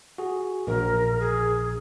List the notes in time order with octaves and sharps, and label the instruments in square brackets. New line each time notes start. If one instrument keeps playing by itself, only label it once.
[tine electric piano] F#4 G#4
[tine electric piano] A#1 [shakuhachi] A#4
[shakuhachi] G#4